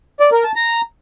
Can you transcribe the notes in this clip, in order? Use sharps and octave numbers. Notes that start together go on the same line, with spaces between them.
D5
A#4
A5
A#5